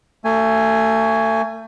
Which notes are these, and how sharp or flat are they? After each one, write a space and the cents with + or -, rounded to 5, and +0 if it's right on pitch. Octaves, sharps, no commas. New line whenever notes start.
A3 +30 G#5 +0